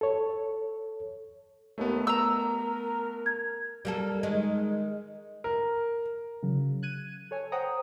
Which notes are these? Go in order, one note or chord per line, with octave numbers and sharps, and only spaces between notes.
A4 C#5
D#2 A3 B3
A#4 A#5 E6
G#6
G3 A#3 A4
D#3 G#3
A#4
C#3 F#3
F#6 G#6 D#7
A4 C#5 G#5
C5 F#5 G5 A#5 D#6